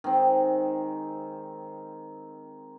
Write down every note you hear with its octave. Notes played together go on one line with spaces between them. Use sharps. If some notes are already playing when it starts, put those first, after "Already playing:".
D#3 G#3 C4